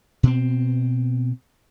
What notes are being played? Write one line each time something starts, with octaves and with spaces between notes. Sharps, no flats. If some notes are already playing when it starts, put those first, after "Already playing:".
B2 C4